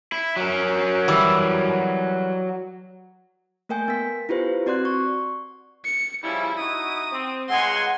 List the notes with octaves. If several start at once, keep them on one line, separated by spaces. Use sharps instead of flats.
E4
F#3 A#4
E3 G3
A3 A#3 A#4 G5 G#5 G6
B3 A#4 B6
E4 F4 G4 B4 C5
C4 F#4 D5 C6 F#6
C#6
C#7
C#3 F3 G3 E4
D#4 E4 F#4 D#6
C4
C#2 G#3 F#5 G#5 C6